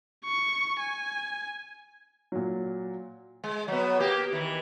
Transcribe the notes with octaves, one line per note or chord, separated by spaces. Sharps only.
C#6
G#5
A#2 F#3
G#3
F#3 B3
A#3 G4
D#3 E3